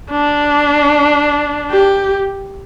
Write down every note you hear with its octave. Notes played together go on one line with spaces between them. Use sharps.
D4
G4